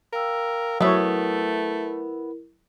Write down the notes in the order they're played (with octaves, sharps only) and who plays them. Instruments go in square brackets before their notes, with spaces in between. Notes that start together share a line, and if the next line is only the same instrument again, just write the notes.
[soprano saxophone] A#4 [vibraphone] F5 G5 E6
[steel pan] F#3 C#5 [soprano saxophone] A3 [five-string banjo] B3 E5 [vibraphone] E4 A#4